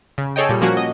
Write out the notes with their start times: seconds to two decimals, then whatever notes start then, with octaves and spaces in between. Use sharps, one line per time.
0.18 C#3
0.36 G#4 A4 C#5 D#5 G5
0.49 A#2 G3
0.61 F3 A#3 C#4 F#4
0.77 D#5